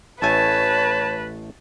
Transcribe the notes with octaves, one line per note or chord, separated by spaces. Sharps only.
A1 A3 B4 C#5 G#5 A5